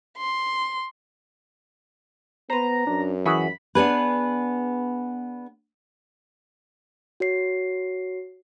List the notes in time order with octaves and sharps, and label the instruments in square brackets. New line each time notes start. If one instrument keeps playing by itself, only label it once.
[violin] C6
[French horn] B3 [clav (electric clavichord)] B4 C5 [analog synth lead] A#5
[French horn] F#2 [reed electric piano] D4
[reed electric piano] E3 [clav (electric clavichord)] F#4 G#4 E5 [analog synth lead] B5
[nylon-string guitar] B3 D4 G#4 B4
[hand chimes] F#4 C#5 C7